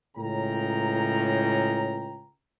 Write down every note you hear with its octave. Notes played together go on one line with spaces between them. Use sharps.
C#2 A2 C#3 G5 A#5